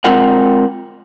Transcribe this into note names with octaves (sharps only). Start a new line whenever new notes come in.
G#3 C4 F4 A#4 F#5